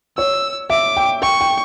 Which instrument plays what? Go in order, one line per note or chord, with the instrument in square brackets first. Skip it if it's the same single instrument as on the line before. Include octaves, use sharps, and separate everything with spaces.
[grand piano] C#5 [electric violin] E6
[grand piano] E5 [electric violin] D6
[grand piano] G5
[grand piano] G5 [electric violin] C#6
[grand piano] G5